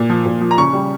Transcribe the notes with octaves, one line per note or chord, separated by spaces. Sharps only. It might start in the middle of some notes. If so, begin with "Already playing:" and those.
Already playing: A#2
F3
A#2
F3
A#5
C#3 C#6
G3